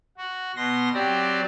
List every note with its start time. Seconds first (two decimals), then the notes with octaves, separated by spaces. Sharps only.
0.17 F#4
0.56 B2 C6 A#6
0.94 F#3 C4 G4 D5